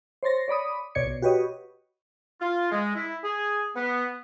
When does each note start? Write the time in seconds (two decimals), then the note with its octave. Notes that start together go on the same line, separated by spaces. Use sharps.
0.23 C5 C#5 C6 A6 A#6
0.48 C#5 D5 B5 D#6
0.95 B1 B2 C#5 D5 G#6 C#7
1.07 B2
1.22 F#4 G4 B4 C#5 D#5
2.41 F4
2.71 G#3
2.95 E4
3.24 G#4
3.76 B3